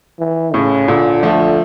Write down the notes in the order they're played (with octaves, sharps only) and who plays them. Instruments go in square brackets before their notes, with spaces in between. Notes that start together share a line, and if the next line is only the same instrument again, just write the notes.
[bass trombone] E3
[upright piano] A2 [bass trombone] C#3
[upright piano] A#2 [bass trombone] D3
[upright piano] F3 A3